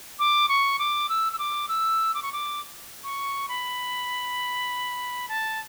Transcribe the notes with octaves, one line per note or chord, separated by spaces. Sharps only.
D6
C#6
D6
E6
E6
D6
E6
D6
C#6
D6
C#6
B5
A5